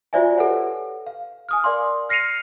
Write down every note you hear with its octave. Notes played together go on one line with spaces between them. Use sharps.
F4 F#4 C5 D5 E5 G#5
G4 A4 B4 C#5 F#5
F5
G#5 D#6 F6
A#4 D5 F5 C6 D6
F6 A#6 C7 C#7 D#7 F7